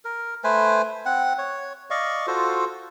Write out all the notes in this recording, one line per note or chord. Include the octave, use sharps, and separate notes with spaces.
A#4
A3 B4 C5 G#5
C4 F#5
C#5
D5 D#5 F5 C#6
F4 F#4 A4 C5